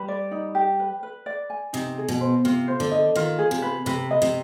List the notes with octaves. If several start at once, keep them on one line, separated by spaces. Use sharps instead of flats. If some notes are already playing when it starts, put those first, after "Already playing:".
Already playing: G3 B4
D5
D#4
G4
B4
B4
D5
G#5
C3 D#4
G#4
B2
C5
C3 F4
C5
D3
D#5
D#3 F4
G#4
C3
B4
C3 B4
D#5
C3